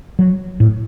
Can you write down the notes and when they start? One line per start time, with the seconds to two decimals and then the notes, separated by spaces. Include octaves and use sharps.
0.19 F#3
0.60 A2